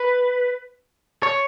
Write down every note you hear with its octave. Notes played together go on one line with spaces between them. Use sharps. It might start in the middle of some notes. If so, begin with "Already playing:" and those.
Already playing: B4
C#5